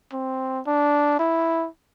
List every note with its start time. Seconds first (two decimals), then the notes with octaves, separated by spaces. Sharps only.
0.13 C4
0.67 D4
1.19 E4